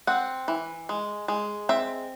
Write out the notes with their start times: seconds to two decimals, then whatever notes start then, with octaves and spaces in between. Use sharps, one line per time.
0.07 C4 F#5
0.48 E3
0.89 G#3
1.28 G#3
1.69 C4 E5